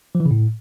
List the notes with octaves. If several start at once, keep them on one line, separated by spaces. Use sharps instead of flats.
F3
E3
C#3
A2